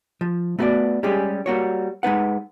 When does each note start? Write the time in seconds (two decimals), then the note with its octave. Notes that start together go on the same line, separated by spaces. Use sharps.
0.21 F3
0.59 A3 B3 F#4 A4 B4 D5
1.03 G3 G#3 C#4 G4 G#4
1.46 G3 A#3 F#4 C#5
2.03 G#3 D#4 B4 F#5